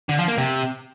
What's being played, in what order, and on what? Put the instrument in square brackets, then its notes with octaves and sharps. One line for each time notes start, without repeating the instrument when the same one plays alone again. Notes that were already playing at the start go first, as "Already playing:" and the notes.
[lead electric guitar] D3
F3
A#3
C3